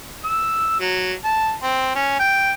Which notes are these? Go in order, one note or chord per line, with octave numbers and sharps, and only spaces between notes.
E6
F#3
A5
C4
C#4
G5